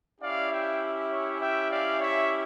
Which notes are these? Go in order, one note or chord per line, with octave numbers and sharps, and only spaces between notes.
C#4 E4 G4 D5 F5
E5 G5
C#5 E5
E5 G5
D5 F5
C#5 E5